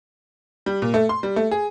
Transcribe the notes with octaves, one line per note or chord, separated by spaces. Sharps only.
G3
A#2
A3
C6
G3
A3
G#4